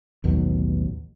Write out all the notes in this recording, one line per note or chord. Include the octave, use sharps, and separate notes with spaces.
A1 D#2 B2 F#3